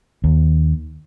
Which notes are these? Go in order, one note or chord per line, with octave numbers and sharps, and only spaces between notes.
D#2